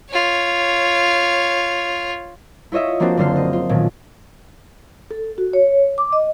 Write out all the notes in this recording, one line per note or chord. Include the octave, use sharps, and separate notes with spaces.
F4 C#5
E4 F4 C#5 D#5 E5
F3 A#3 C4 D4 F#4 C5
F#1 D3 D4 C5 F6 C7
C5 D#5
F4
B1 A#2 D#3
A4
F#4
C#5
D6
D#5